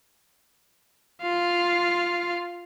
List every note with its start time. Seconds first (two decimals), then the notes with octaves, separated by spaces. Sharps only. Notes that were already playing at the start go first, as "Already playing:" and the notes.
1.22 F4 F5